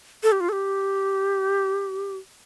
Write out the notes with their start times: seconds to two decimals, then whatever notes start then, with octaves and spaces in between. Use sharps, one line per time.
0.23 A4
0.32 G4
0.40 F4
0.49 A4
0.52 G4